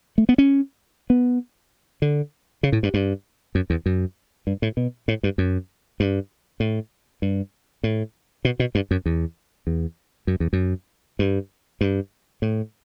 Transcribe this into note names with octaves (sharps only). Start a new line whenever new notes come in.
A3
B3
C#4
B3
D3
C#3
A2
G2
G2
F#2
E2
F#2
G2
A2
B2
A2
G2
F#2
G2
A2
G2
A2
B2
B2
G2
F#2
E2
E2
F#2
E2
F#2
G2
G2
A2